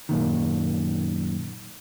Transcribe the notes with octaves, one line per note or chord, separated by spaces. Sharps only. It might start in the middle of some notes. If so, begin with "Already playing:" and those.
F#2 A#2 D#3